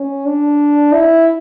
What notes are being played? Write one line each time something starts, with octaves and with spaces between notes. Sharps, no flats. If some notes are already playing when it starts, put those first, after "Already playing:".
Already playing: C#4
D4
E4